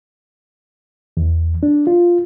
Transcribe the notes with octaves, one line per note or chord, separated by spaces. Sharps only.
E2
D4
F4